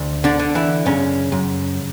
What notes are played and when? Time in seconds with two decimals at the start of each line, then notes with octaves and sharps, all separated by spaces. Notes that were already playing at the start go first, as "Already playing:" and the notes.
Already playing: D2
0.24 D3 D4
0.39 D3
0.55 E3 E4
0.86 F#2 C#3 C#4
1.32 F#2